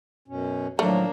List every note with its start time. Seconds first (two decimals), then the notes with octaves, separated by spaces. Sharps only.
0.28 F#2 B2 C#4
0.79 A2 D#3 F3 F#3 A3 A#3 D4